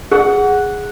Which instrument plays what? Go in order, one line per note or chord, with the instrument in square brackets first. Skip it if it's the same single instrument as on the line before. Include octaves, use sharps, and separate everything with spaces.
[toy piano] G#4 [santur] F#5